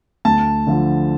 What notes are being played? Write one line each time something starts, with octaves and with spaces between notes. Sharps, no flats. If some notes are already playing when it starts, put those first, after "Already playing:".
D2 A5
D3 F3